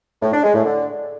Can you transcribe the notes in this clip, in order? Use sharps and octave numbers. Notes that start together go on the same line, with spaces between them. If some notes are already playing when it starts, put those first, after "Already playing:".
A2
D4
G#3
A2
D3